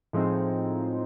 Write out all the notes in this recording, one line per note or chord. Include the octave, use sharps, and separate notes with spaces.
A2 F3 G#3 C4 D#4